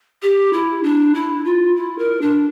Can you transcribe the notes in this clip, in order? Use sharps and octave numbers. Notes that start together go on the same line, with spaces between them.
G4
E4
D4
E4
F4
E4
A#4
D4